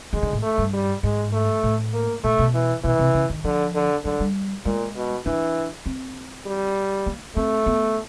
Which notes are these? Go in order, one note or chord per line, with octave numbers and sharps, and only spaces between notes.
D#3 G#3
D3
A2
A3
G2
G3
G#2 G#3
A3
A2
A#3
A#2 A3
B2
E3
B2 E3
C3
C#3
D#3
D3 F3
D3
D3 F#3
G3
A#2 G#3
B2
E3 D4
C4
G3
A#3
A3 C4
B3